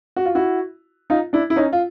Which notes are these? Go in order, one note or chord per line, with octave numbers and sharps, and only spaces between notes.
F#4
F4
E4 F#4
D#4 F4
D4 E4
E4
C#4 D#4
F4